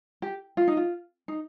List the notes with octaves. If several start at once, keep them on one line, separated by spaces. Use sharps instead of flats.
G4
F4
D#4
F4
D#4